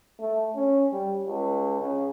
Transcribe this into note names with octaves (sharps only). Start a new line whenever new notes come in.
A3
C#4
G3
C#2
C#3